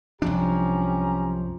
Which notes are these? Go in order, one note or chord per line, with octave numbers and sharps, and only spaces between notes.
C2 F#2 F3 C#4 D4 G4 A#5